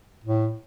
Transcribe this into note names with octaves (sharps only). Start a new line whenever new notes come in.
A2